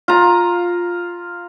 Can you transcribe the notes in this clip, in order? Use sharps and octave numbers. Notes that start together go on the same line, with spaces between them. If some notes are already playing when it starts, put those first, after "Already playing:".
F4 A#5